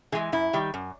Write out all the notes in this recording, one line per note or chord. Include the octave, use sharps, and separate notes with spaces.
E3 G#3 G#4
F#2 E4
D#3 G3
F#2